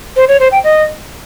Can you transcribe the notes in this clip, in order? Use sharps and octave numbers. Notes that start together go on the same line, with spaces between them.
C5
C#5
C5
G5
D#5